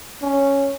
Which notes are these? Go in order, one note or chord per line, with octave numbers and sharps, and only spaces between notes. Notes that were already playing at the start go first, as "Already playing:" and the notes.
C#4